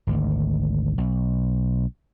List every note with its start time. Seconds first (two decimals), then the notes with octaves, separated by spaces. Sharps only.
0.07 G#1 D2
0.98 B1